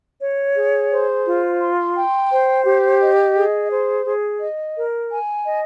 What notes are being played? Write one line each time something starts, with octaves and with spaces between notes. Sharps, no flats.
C#5
G#4
C5
F4
C6
G5
C5
G4
D#5
G#4
C5
G#4
D#5
A#4
G#5
D#5